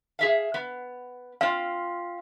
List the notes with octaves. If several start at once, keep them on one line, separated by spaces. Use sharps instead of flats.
G#4 E5 F5
B3
C4 F4 F5